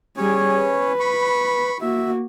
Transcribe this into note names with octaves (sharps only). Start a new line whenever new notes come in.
G3 C#4 G#4 C#5
B4
B5 C#6
A#3 F#4 E5